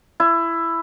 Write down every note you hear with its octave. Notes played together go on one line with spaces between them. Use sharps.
E4